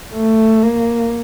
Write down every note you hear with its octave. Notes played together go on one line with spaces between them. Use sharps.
A3
A#3